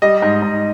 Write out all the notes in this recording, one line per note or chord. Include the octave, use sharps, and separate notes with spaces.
G3 D#5
G#2
G#2